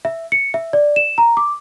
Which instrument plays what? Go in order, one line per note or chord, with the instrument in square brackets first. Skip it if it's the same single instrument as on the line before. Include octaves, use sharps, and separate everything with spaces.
[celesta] E5
C#7
E5
D5
E7
A#5
D6